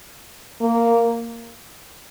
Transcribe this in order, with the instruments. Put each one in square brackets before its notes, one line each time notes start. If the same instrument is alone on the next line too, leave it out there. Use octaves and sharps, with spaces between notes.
[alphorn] A#3